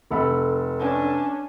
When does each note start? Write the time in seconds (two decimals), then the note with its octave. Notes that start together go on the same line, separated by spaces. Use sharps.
0.11 F1 A4 B5
0.79 C#4 D4